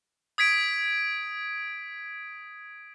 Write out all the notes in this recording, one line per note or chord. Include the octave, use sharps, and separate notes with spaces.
D#6 G#6 B6 D7